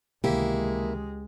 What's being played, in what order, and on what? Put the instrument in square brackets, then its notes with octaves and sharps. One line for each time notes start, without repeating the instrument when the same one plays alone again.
[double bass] C#2 G#3 [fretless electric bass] C3 D#3 E3 [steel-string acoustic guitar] A#3 E4 [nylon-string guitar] G4